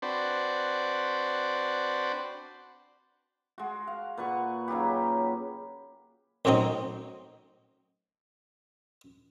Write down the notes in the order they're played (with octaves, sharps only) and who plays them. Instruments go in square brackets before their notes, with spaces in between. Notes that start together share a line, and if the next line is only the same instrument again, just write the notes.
[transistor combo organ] C4 D4 F#4 B4 C5 D5
[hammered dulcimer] G#3 F#4
F5
A#2 B4 F#5 C#6
C#3 F#3 D#4 G4
[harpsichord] C2 A2 F#3 C4 D#4